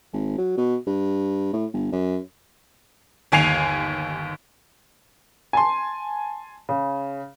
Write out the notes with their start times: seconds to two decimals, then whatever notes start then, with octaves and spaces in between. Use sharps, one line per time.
0.13 G#1
0.38 F#3
0.57 B2
0.87 G2
1.53 A2
1.73 G1
1.92 F#2
3.32 G1 D#2 G#5 C7 F7
5.53 G#5 A5 C6
6.69 C#3